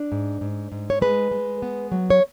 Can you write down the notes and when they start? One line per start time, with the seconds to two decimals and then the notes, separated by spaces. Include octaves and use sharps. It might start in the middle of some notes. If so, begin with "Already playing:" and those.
Already playing: D4
0.12 G#2
0.41 G#2
0.72 G#2
0.90 C#5
1.02 G#3 B4
1.31 G#3
1.62 B3
1.92 F#3
2.10 C#5